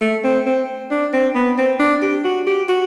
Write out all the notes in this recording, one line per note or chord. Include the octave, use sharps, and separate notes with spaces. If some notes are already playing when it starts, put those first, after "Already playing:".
A3
C4
C4
D4
C4
B3
C4
D4
G4
F#4
G4
F#4